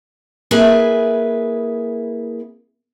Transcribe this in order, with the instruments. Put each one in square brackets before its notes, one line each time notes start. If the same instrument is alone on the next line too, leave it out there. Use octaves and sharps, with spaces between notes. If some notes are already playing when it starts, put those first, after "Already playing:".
[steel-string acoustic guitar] A#3 E4 G#4 B4 E5 G#5